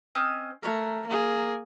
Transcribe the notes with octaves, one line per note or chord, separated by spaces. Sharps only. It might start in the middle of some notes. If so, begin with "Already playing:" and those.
C4 C#4 D#5
A3 A#4 C#5 F#5
A#3 G#4